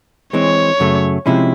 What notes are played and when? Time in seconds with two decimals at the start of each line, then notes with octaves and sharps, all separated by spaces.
0.33 E3 G#3 C4 C#5
0.80 F#2 C#3 F#3 A3
1.26 C3 F3 G#3 C#4 E4